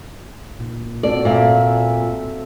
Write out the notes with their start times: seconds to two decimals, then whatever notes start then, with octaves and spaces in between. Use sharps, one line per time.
0.60 A#2
1.03 C4 F#4 A4 D5
1.25 A#2 E5